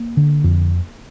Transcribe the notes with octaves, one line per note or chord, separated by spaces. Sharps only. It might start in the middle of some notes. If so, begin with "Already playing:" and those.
Already playing: A#3
D3
F2